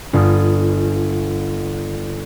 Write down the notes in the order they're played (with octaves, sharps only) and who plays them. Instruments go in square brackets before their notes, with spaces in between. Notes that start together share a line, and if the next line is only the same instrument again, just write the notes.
[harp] G1 F4 D#6